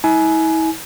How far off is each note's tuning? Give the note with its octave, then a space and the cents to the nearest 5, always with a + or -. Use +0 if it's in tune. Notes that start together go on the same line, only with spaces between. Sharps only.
E4 -40 G#5 +25